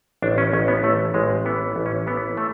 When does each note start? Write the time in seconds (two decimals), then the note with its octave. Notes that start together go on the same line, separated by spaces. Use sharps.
0.22 A1 D4
0.38 C#4
0.53 A1 C#4
0.68 B3
0.83 A1 A3
1.14 A1 G#3
1.45 E3 B3
1.76 A1
1.86 C#4
2.07 E3 B3
2.37 A3